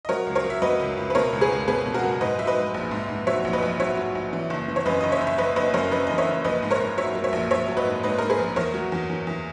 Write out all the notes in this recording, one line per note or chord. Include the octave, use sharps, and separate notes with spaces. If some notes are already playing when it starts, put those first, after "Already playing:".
D#5
F#3 A#4 C#5
C#2
A#4 C#5
F#3
E5
F#3 B4 D#5
C#2
C#2
B4
B2 A#4 C#5
C#2
G#4 B4
C#2
B2 G#4 B4
B2
F#4 A#4
F#3
G#2 B4 D#5
F#3 E5
B4 D#5
G#2
A#1
G#2
G#2
F#3 C#5 E5
A#1
B4 D#5
A#1
F#3 C#5 E5
F#3
A#1
E3
F#1
E3
C#5
F#2 B4 D#5
F#1 D#5
C#5 E5
F#1
E5
F#1 B4 D#5
F#1 B4 D#5
F#2 A#4 C#5
F#1 B4 D#5
E3 D#5
C#5 E5
F#1
A#1 B4 D#5
G#2
A#4 C#5
G#2
F#3 C#5 E5
F#3
C#5 E5
A#1
A#1 C#5 E5
F#3
B4 D#5
G#2
G#2 B4 D#5
G#2 A#4
G#4 B4
A#1
E2 A#4 C#5
F#3
E2
E2
E2